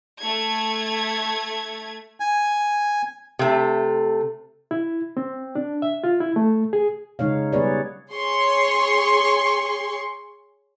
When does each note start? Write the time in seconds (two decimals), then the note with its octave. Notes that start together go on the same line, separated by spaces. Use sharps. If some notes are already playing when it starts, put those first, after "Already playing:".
0.20 A3 G#6
2.20 G#5
3.39 C3 A3
4.71 E4
5.17 C4
5.55 D4
5.82 E5
6.04 F4
6.21 E4
6.36 A3
6.73 G#4
7.19 C#3 G#3 D#4 C#5 F5
7.53 G3 B3 G#4 B4 C#5 D5
8.12 G#4 C#5 C6 C#6